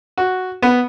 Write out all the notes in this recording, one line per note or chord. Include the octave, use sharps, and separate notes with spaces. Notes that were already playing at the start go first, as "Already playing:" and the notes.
F#4
B3